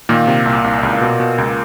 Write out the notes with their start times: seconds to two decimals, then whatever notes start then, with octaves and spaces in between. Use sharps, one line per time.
0.09 A#2 D#3 A#3
0.27 C3
0.46 C2
0.64 C2
0.83 C#2
1.01 B2
1.20 B2
1.38 C#2